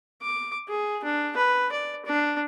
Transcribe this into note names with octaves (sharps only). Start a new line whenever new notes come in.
D6
G#4
D4
B4
D5
D4